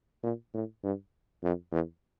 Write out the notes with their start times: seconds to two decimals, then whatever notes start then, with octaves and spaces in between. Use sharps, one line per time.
0.23 A#2
0.54 A2
0.84 G2
1.43 F2
1.72 E2